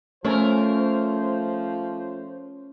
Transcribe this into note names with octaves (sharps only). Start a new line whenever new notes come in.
F3 A3 C#4 A#4 C5 C#5